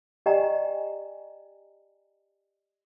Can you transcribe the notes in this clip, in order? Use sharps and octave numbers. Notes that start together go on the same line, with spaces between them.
G4 D5 D#5 G5 G#5 A#5